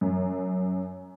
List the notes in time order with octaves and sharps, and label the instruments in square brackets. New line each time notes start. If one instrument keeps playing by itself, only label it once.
[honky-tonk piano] F#2